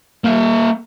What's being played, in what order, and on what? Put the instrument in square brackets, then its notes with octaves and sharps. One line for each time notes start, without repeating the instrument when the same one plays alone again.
[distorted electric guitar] A#3 E5